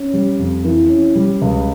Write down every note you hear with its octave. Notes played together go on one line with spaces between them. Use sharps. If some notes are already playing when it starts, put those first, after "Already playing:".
Already playing: C#4
G3
F2
E3
C#4
G3
C#2